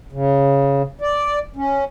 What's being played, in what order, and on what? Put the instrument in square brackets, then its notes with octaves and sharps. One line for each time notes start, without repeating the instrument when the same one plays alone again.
[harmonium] C#3
D5
C#4